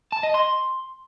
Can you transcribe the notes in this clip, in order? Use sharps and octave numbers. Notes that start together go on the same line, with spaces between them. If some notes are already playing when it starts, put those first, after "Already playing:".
A5
D#5
C6